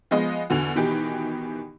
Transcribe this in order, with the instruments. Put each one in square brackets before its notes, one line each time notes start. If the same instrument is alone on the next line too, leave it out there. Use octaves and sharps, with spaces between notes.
[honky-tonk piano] F3 G#3 B3 D#5
E2 D3 F#4
B2 D#3 E3 D#4 G4